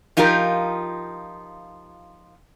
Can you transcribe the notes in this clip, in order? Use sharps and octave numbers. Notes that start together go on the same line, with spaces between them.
F3 D#4 F4 G4 A#4